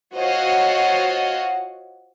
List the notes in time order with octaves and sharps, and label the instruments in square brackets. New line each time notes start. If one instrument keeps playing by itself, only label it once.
[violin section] F4 F#4 C5 C#5 D#5 F#5